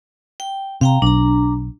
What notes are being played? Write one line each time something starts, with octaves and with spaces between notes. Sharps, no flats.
G5
C3 F5 G5 A#5
B1 D4 A#5